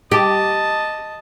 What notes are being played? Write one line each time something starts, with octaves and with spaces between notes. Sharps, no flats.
G4 D#5 A5